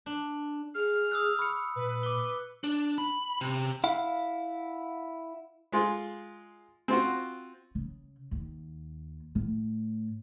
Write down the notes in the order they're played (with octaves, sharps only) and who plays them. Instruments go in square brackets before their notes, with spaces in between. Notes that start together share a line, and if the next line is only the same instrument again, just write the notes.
[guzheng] D4
[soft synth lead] G#4 [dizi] F6
[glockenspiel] D#6 E6 F#6
[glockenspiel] B5 C#7 [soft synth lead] C#6
[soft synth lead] A#2 [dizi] B4
[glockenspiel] D6 G7
[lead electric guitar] D4
B5
C3
[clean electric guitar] E4 F5 F#5
[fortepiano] G#3 F4
C4 F4 F#4
[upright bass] C#3
D#2
A2